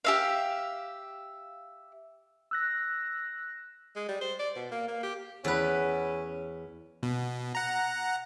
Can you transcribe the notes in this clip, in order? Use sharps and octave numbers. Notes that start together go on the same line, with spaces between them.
G4 E5 F5
E6 F#6 A#6
G#3
G3
C5
D5
B2
A#3
A#3
G4
E2 C#4 B4
B2
F#5 A#5